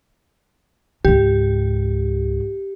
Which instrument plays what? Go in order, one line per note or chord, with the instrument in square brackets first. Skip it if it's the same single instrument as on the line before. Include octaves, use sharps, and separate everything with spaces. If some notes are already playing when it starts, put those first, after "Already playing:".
[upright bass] C#2 G#2 [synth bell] G4